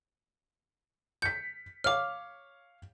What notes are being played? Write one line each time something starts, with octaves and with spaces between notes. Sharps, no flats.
G6 B6 C#7
C#5 F5 D6 F6